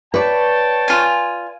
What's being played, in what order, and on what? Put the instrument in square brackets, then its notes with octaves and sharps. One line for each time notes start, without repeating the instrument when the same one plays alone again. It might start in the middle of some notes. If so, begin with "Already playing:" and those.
[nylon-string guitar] B4 D5 [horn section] C#5 G5 A5
[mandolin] F4 G#5